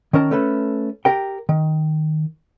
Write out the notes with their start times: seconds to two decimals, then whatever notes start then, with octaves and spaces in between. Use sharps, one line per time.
0.13 D#3 C#4 A#4 A5
0.31 A3 C#4 A4 B4
1.05 G4 A#4 G5
1.49 D#3